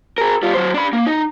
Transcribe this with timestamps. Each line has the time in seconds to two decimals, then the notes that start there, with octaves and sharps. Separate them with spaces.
0.18 G#4 A#4
0.43 G3 F4
0.54 F#3 C5
0.74 D4 B5
0.93 A#3
1.06 D#4